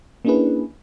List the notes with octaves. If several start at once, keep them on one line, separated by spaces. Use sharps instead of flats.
A#3 C#4 D4 E4 G#4 B4